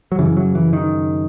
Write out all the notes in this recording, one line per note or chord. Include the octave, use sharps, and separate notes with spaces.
F#3
F#2 C#3 E3
F#3
E3
D#3